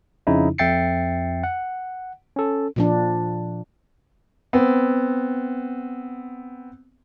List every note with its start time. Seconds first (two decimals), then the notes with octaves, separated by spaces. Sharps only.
0.27 F2 C#3 F3 C#4 D#4 E4
0.58 F2 E5 G5 A6 C7 C#7
1.44 F#5
2.36 C#4 A4
2.76 A#2 F3 D4
4.53 B3 C4